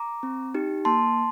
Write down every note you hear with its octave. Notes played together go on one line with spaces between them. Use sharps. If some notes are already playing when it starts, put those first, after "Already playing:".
Already playing: A#5 D6
C4
D#4 G4
A#3 A5 C6